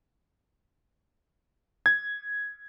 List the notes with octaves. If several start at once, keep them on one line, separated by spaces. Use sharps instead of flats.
G#6